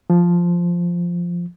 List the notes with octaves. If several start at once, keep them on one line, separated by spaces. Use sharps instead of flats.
F3